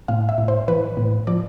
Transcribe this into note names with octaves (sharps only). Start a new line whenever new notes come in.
A2 F5
E5
A2
C5
E3 B4
A2
F3 D5